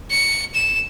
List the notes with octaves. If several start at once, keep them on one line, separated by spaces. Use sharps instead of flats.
C#7
E7